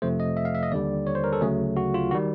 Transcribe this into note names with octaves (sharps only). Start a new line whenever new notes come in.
F2 C3 F3 A3 C5
D#5
E5
F5
E5
D#5
D#2 D3 G3 D5
C#5
C5
A#4
A4
D2 C#3 F#3 A3 G#4
F#4
F4
D#3 G3 F#4